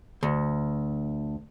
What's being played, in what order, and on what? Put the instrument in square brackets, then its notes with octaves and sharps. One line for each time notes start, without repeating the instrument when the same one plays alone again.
[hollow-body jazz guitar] D2